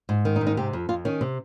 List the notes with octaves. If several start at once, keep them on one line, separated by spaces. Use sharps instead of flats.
G#2
D#3
D#4
G#2
D#4
C3 G4
F2
F2 F4
D#3 C#4
C3